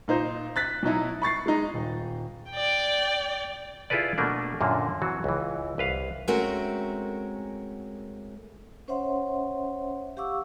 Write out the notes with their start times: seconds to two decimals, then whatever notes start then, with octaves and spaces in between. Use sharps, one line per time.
0.08 A#2 D#4 C5
0.56 F#6 A6 B6
0.83 B2 F#3 D#4 E4
1.22 B5 C#6 A6 C7
1.46 G#3 D#4
1.74 D#1
2.51 D5 G5
3.90 E4 F4 G#4 A4 B4 D5
4.18 B2 A3 A#3 D4
4.61 F#2 A#2 D3 A#3
5.02 E3 F#3 C4 F#4
5.24 C#2 E3
5.78 C2 B4 F5
6.28 G#3 A3 C4 C#4 F#4 A#4
8.88 C#4 C5 C#5 E5 F#5 C6
10.17 G4 F5 F#5 C#6 D6 E6